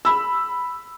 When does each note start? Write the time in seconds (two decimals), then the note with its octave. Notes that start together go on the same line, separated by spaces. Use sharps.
0.05 B5 E6